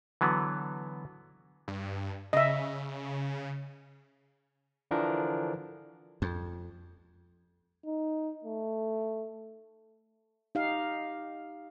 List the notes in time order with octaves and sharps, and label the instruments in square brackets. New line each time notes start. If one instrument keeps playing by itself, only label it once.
[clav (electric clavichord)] D3 E3 F#3 B3
[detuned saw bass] G2
[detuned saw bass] C#3 [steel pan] D#5 E5
[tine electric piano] D3 E3 F3 D4 A#4
[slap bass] F2
[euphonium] D#4
A3
[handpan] D#4 G4 F5